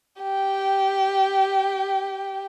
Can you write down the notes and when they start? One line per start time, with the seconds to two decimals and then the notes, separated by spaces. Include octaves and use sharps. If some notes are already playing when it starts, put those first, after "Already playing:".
0.22 G4 G5